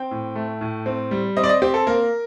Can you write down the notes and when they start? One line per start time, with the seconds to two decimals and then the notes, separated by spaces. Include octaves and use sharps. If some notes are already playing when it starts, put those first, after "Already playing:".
Already playing: C4 G5
0.11 A2
0.36 A3
0.61 A2
0.86 C4
1.11 G3
1.37 C4 D#5
1.44 D5
1.49 D#5
1.62 C4 G4
1.74 A4
1.87 A#3 A#4